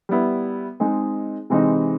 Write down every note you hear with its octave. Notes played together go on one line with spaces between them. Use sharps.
G3 B3 E4
G#3 C4 D#4 G#4
C3 E3 G#3 C4 D#4